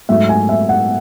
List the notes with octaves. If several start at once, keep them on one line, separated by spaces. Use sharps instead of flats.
G#2 F#3 A3 E5
G#5
E5
F#5